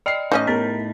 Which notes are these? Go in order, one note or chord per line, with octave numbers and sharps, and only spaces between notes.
D5 D#5 G5 F6 C7
A2 E3 C#4 D#4 D#5 G6
B3 A#4 A6 B6